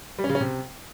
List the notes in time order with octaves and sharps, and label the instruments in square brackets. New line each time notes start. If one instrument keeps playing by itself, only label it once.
[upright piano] G3
C#4
C#3
C#4
C3